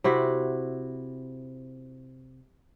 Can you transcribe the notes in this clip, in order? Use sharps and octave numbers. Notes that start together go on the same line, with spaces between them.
C3 E4 F#4